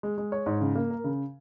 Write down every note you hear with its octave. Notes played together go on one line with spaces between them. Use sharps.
G#3
G#3
C#5
G#2
C#3
A#3
A#4
C#3